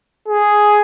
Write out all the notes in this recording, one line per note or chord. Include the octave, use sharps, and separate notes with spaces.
G#4